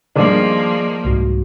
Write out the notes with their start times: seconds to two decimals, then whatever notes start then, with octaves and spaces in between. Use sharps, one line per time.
0.16 G2 D#3 F3 A#3 D4 G#4 D5
1.05 C2 G#2 F#4